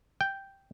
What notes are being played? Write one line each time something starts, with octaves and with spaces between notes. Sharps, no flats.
G5